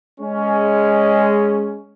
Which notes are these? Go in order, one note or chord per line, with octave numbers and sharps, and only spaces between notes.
G#3 C#4